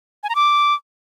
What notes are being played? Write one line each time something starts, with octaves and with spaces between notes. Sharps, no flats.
G#5
A#5
D6